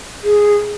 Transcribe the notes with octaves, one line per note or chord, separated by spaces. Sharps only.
G#4